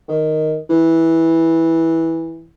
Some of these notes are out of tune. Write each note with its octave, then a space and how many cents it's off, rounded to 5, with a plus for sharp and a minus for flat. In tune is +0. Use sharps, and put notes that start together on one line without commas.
D#3 +0
E3 -10